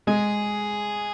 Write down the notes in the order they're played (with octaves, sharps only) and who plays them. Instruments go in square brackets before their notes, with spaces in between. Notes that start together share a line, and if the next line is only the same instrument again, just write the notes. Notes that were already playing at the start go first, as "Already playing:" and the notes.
[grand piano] G#3 [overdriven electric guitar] G#4